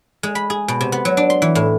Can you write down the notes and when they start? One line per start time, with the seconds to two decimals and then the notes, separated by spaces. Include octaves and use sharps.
0.23 G#3
0.35 B5
0.50 G#4
0.68 B2
0.81 C3
0.92 B3
1.05 F#3
1.17 D4
1.30 C6
1.42 E3
1.55 A2